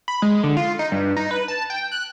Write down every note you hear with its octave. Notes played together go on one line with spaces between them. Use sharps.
B5
G#3
D3
F4
D#4
G2
D#4
B4
A5
G5
F#6